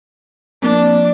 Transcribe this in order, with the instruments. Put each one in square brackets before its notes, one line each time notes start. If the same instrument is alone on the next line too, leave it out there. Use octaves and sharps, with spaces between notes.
[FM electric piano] F3 A#3 C4 [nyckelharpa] D4